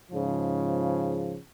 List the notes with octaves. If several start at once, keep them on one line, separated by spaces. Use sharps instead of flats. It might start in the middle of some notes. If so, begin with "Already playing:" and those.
G#2 C#3 F3